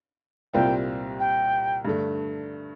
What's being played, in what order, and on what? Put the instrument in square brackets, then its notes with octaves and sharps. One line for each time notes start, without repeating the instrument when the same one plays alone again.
[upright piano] C2 A#2 G3 C4 F4 [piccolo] G5
[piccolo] G5
[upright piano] G2 D3 A3